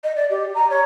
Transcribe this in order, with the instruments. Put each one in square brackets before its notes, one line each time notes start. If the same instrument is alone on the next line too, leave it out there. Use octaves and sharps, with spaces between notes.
[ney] D#5
D5
G4
A#5
C#5